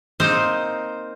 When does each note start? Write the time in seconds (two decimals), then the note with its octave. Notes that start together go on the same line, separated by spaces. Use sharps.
0.20 A#3 C4 D#4 C5